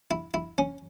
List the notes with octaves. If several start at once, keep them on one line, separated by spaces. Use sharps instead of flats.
E4
E4
C#4